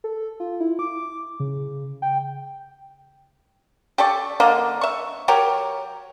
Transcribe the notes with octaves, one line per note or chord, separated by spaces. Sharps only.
A4
F4
E4
D6
C#3
G5
G4 A4 D5 C#6
D3 A#3 D#5
E5 C#6
F#3 G4 A#4 C#5